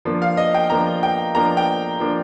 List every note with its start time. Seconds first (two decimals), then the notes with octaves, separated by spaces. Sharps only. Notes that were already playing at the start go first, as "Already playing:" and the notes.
0.05 F3 A#3 D4
0.22 F5
0.37 D#5
0.54 G5
0.70 F3 A#3 D4 A#5
1.03 G5
1.35 F3 A#3 D4 A#5
1.57 G5
2.00 F3 A#3 D4